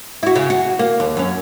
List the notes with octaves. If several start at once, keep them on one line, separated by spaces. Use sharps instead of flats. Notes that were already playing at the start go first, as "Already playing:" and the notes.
E4 F#4
C#3
F#4
A#3
D#2
F#2 C#4